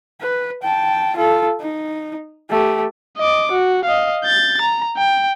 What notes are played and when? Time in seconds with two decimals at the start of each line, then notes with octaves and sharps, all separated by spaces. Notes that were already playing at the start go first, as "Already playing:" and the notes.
0.21 B4
0.63 G5 A5
1.16 F4 A4
1.61 D#4
2.50 A3 G4
3.17 D#5 D6
3.52 F#4
3.85 D#5 F5
4.24 G6 A6
4.62 A#5
4.97 G5